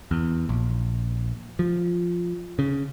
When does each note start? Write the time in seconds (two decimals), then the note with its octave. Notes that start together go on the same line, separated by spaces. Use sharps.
0.11 E2
0.49 A#1
1.59 F3
2.59 C#3